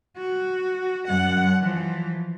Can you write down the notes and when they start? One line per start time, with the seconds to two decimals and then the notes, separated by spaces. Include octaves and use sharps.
0.17 F#4
1.08 F#2 F#5
1.60 E3 F3